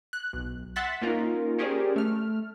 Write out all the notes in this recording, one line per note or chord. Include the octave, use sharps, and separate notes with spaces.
F#6
B1
E5 F#5 C6 F#6 A6 B6
A#3 C#4 D#4 F4 A#4
C#4 G4 G#4 A#4 C5 D5
A3 F6